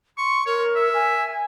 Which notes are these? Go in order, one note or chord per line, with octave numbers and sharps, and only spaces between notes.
C6 C#6
A#4 C#5
E5
G#5